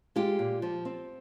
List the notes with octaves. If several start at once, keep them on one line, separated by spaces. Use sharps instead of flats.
G#3 F4 G4
A#2
F3
C4